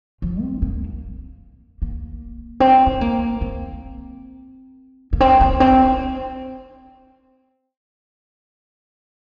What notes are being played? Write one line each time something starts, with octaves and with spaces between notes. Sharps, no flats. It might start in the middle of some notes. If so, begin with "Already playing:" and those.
F3
C4
A#3
A#3
C4
C4
A#3
C4
A#3
C4
A#3
C4